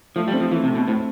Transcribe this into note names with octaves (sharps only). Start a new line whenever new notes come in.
F3 A3
G3
C4
F3
E3 A3
C3
A3
B2
A2 C4